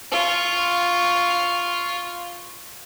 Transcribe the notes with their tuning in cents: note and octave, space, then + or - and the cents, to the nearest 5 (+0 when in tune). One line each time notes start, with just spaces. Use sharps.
F4 +0 C#6 +0